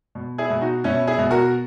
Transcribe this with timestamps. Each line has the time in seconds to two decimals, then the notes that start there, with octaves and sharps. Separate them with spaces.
0.15 B2
0.38 E4 G#4
0.50 B2
0.61 D#4 F#4
0.84 B2 C#4 E4
1.07 E4 G#4
1.18 B2
1.31 F#4 A#4